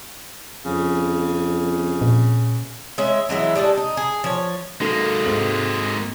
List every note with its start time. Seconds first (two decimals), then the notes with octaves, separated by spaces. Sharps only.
0.65 F2 C#3
2.02 A#2
2.98 G#3 C#4 E5
3.29 E3 F#3 G#3 E4
3.55 G3 G#3 D4 A4
3.77 D#4
3.97 G#4
4.24 F3 C#5
4.81 G#3 A#3 D#4 F#4 A4
5.25 G#2 C4 F#7